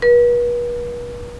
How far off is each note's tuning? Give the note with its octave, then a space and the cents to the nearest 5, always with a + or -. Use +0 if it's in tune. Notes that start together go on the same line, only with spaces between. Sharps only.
B4 -40